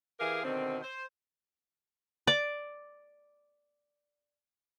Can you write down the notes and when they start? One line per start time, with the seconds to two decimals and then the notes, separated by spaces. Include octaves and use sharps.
0.20 E3 G4 G#4 A#4 F5
0.43 B2 D3 D#3 C4
0.83 C5
2.27 D5 D6